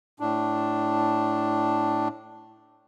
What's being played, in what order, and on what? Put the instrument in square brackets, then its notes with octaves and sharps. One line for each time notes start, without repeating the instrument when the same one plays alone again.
[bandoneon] A2 D4